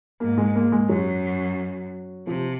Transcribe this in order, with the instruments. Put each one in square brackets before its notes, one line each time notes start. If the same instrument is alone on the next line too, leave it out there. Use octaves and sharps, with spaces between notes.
[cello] G#2 [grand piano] A#3
[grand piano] G#3
A#3
G#3
[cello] F#2 [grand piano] F#3
[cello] C3 [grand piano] F3